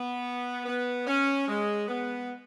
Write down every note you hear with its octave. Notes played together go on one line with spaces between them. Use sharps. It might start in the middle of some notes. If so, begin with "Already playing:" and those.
Already playing: B3
B3
C#4
G#3
B3